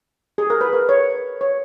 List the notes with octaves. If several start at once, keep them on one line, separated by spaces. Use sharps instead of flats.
G#4
A#4
B4
A#4
C#5
C#5